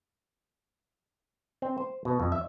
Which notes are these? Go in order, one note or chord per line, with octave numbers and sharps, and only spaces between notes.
C4
C5
B2
F2
E5